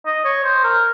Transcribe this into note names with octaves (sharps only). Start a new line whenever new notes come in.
D#5
C#5
C5
A#4